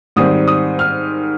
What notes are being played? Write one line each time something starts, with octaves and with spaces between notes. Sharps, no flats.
G#2 D#3 G3 C4 D#6
D#6
F6